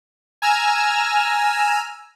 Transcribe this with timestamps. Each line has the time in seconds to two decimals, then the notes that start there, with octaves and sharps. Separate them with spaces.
0.42 G#5 A#5 E6 F6